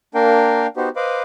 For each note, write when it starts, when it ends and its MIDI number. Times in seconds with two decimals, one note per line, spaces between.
0.15 0.67 58
0.15 0.67 62
0.15 0.67 70
0.15 0.67 77
0.15 0.67 79
0.77 0.89 59
0.77 0.89 63
0.77 0.89 66
0.77 0.89 67
0.77 0.89 72
0.96 1.23 71
0.96 1.23 72
0.96 1.23 75
0.96 1.23 77
0.96 1.23 83
0.96 1.23 86